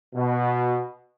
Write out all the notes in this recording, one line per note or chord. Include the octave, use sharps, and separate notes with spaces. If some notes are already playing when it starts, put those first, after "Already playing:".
B2